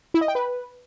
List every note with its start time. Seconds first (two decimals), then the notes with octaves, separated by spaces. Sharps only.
0.14 E4
0.21 D#5
0.28 G5
0.35 B4